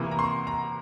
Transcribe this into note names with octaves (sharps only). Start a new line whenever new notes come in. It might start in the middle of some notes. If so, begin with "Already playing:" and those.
Already playing: C3 E3 A#3 E4 C#6
A#5
C6
A#5